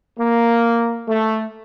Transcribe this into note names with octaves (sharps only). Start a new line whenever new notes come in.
A#3
A3